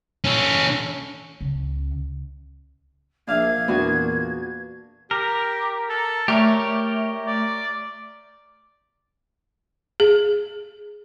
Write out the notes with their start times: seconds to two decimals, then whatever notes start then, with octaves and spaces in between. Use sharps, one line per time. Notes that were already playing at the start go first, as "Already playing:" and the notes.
0.24 C#4 A4
1.41 C#2
3.28 A#1 D4 E5 F5 G#6
3.68 E2 A#2 B3 D4 F#4
5.11 G4 A#4
5.89 A4
6.28 A3 G4 A#4 C#5 D5
7.27 D5
10.00 G#4